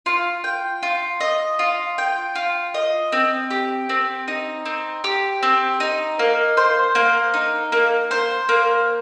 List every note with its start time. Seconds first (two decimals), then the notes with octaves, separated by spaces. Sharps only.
0.06 F4
0.44 G5
0.83 F4
1.20 D#5
1.59 F4
1.98 G5
2.35 F4
2.74 D#5
3.12 C4
3.51 G4
3.89 C4
4.28 D#4
4.65 C4
5.04 G4
5.43 C4
5.80 D#4
6.19 A#3
6.57 C5
6.95 A#3
7.34 D#4
7.72 A#3
8.11 C5
8.49 A#3